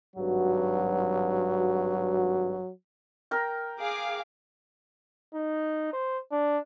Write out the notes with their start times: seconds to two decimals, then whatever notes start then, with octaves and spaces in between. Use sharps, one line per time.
0.16 G#1 G2 F#3 F#4
3.31 A#4 G5
3.80 G#4 F5 D6
5.34 D#4
5.93 C5
6.31 D4